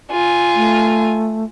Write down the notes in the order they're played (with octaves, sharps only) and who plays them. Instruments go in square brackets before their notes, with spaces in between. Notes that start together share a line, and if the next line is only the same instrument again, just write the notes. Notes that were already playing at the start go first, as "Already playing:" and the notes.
[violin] F4 G#5
[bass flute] A3